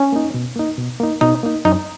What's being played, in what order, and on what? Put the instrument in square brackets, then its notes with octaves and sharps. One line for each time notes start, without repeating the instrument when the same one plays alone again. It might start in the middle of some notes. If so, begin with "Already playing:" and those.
Already playing: [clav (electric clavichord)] C#4
[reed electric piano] A#3 D#4
B2
A#3 D#4
B2
A#3 D#4
[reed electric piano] B2 [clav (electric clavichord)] D#4
[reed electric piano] A#3 D#4
[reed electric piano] F#2 [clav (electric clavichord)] D#4